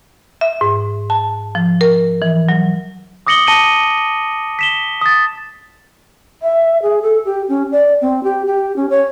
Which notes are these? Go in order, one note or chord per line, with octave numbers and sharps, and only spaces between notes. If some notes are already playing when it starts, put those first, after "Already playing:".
E5
G#2
A5
F3
A#4
E3
F#3
D6 D#6 A#6 C#7 F#7 G7
A5 A#6 C#7 D#7 G7
B6 E7 G7
D#6 A6
E5
G#4
A4
G4
C#4
D5
C4
G4
G4
C#4
C#5